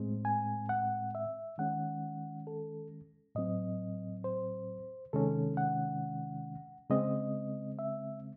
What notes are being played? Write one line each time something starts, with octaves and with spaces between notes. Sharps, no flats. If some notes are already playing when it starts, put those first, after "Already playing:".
Already playing: A2 G#3 C4
G#5
F#5
E5
D#3 G#3 C#4 F#5
A4
A2 F#3 C4 D#5
C5
C3 D#3 G#3 C#4 A4
F#5
C#3 G#3 C4 D#5
E5